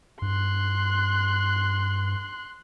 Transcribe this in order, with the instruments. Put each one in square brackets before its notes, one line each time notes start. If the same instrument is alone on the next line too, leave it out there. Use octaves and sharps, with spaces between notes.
[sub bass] G2 [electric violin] C6 F#6